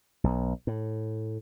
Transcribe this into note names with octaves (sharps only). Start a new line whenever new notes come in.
B1
A2